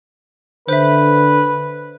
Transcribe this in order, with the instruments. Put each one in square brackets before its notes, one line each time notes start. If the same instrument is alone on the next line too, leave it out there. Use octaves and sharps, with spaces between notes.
[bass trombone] D3 [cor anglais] B4 [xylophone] C5 E5